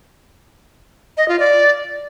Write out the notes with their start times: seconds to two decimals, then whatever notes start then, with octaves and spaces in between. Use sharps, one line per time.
1.17 D#5
1.28 F4
1.39 D5